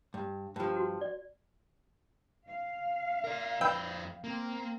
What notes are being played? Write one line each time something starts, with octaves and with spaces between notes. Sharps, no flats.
G2
G2 F3
F#4
D5
F5
A#4 D5
F2 B4 D5 E5 G5
A#3 C4